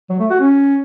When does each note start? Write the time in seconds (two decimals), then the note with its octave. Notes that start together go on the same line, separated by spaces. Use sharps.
0.10 F#3
0.20 A3
0.30 F#4
0.40 C#4